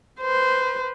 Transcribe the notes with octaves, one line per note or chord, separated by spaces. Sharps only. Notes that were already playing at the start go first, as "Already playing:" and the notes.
B4 C5